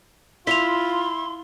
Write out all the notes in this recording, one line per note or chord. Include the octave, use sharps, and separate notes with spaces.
E4 F4 C6 B6 F7